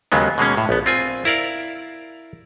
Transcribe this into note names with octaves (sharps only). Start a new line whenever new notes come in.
D#2 C#3 F#3 G#3 B3
B2 G#3 A#3 C#4
A2
A#1 B3
C4 F4 G#5
E4 A#4 D5 F5